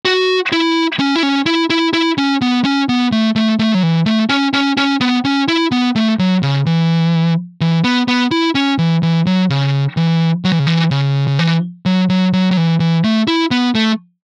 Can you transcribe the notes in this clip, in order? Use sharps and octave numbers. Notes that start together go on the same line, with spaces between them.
F#4
E4
C#4
E4
C#4
E4
E4
E4
C#4
B3
C#4
B3
A3
A3
A3
F#3
E3
A3
C#4
C#4
C#4
B3
C#4
E4
B3
A3
F#3
C#3
E3
E3
B3
B3
E4
C#4
E3
E3
F#3
C#3
E3
F#3
E3
C#3
E3
C#3
C#3
E3
F#3
F#3
F#3
F#3
E3
E3
A3
E4
B3
A3